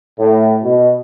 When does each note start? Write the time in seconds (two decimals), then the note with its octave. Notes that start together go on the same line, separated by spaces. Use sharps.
0.19 A2
0.64 B2